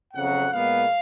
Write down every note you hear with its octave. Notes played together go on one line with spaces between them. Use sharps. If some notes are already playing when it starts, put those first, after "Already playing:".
F2 C#3 F#3 F#5
A#2 G#3 B3 F5